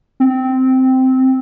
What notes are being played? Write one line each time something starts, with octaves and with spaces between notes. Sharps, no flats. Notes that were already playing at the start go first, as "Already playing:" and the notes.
C4